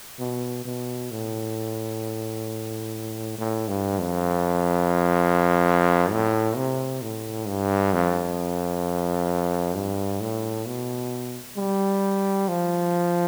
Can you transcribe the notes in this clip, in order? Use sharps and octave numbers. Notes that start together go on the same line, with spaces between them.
B2
B2
A2
A2
G2
F2
A2
C3
A2
G2
F2
G2
A2
B2
G3
F3